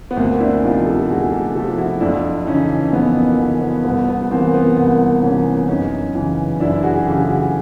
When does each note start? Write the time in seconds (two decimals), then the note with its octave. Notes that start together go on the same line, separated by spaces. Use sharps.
0.11 B3
0.17 D2 A#3 C4
0.40 D4 E4
0.63 C3 F3 D#4 F4
0.86 G4 A4
1.09 D2 F#4 G#4
1.32 G4 A4
1.55 C3 F3 G4 A4
1.78 E4 F#4
2.01 F2 D4 E4
2.47 C#3 E3 C#4 D#4
2.92 F2 B3
3.16 A#3
3.39 C#3 E3 B3
3.61 B3
3.84 C2 B3
4.08 B3
4.31 C3 E3 A#3 C4
4.54 B3
4.76 C2 A#3 C4
5.22 C3 E3 B3 C#4
5.68 F#2 C#4 D#4
6.15 C#3 E3
6.60 F#2 D4 E4
6.83 F#4 G#4
7.06 C#3 E3 G4 A4
7.29 F#4 G#4